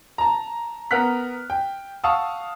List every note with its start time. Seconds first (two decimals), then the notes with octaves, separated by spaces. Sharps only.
0.18 A5 A#5
0.91 B3 A#4 F#5 F6 F#6 B6
1.50 G5
2.04 F5 F#5 A5 C#6 D#6 E6